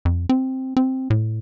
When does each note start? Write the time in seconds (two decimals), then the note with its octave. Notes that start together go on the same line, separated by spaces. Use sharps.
0.05 F2
0.29 C4
0.77 C4
1.10 A2